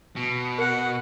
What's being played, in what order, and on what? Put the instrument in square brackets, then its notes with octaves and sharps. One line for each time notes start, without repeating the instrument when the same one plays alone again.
[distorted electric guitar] B2
[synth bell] A#4 [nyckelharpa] F#5